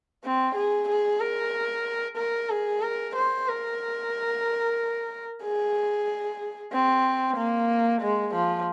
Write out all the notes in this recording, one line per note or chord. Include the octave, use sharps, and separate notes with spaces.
C4
G#4
G#4
A#4
A#4
G#4
A#4
C5
A#4
G#4
C4
A#3
G#3
F3